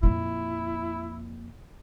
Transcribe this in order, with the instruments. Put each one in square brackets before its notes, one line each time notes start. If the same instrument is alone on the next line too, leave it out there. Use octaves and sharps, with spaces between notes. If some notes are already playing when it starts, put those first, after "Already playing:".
[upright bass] F2 A#2 [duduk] E4